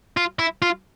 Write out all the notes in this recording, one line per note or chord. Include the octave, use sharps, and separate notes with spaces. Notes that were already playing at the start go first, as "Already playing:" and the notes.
F4
E4
F4